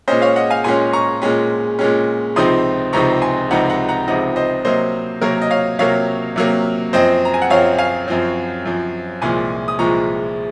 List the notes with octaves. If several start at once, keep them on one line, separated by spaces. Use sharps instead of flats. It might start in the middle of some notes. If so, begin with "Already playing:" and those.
A#2 G#3 C#4 C5 D#5
C#5 F5
D#5 F#5
F5 G#5
A#2 G#3 C#4 G#5 C6
A#5 C#6
A#2 G#3 C#4
A#2 G#3 C#4
C#2 C3 F3 C4 D#4 C6 D#6
C#2 C3 F3 C4 D#4 A#5 C#6
G#5 C6
C#2 C3 F3 C4 D#4 F#5 A#5
F#5 A#5
F#5 A#5
C#2 C3 F3 C4 D#4 D#5 F#5
C5 D#5
C3 F#3 A#3 C5 D#5
C3 F#3 A#3 A#4 C#5
D#5
C#5 F5
C3 F#3 A#3 C#5 F5
C3 F#3 A#3
F#2 F3 C4 C5 D#5
A#5
G#5
F#5
F#2 F3 C4 C#5 F5
F5 G#5
F#2 F3 C4
F#2 F3 C4
C2 A#2 F3 G#3 G#5 C6
D#6
C2 A#2 F3 G#3 A#5 C#6